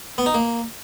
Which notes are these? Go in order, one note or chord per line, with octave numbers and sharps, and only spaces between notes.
B3
D#4
A#3